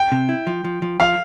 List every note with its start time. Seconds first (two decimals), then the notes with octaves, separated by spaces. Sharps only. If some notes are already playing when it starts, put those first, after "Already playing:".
Already playing: G5
0.12 C3
0.29 E4
0.47 F3
0.64 F3
0.82 F3
1.00 F3 F5